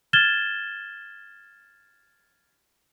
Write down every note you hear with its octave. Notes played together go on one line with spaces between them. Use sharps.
F6 G#6 A6 E7 G7